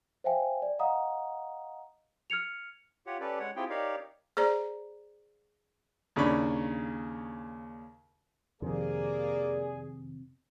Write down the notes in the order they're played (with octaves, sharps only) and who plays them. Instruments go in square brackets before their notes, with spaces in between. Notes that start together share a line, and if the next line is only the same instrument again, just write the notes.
[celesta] C5 E5 F5 G5 G#5
D5
D#5 F5 F#5 A#5 D#6
F6 G#6 C#7 F7
[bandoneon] F4 G4 C#5 F#5
C#4 G4 A4 B4 D5
G#3 C#5 F#5
C4 E4 F4 G4 G#4 G5
D#4 G4 A#4 C#5 D5 F5
[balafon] G#4 C5 D5 A#5
[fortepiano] D#2 C#3 D4 B5 C#6
[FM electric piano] F2 D#3 [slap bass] C3 [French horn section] A#3 D5 [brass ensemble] G#4